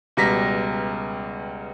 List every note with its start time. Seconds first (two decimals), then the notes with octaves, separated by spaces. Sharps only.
0.17 C#2 B2 G3 A#5 A#6 B6